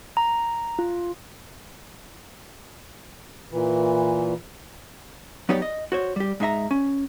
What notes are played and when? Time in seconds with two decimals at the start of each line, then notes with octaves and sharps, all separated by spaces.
0.17 A#5
0.79 F4
3.51 A#2 E3
5.49 F#3 B3 D#4 G4 C#5 D5
5.62 D#5
5.92 F#4 C5 C#5
6.16 G3 G4
6.40 G#2 D#4 E5 A#5
6.71 C#4